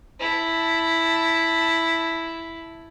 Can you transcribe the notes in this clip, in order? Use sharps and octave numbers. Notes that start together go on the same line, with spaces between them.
E4 A5